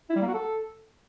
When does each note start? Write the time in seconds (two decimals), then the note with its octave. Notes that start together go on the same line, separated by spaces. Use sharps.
0.10 E4
0.16 G3
0.22 A#3
0.28 F#4
0.34 A4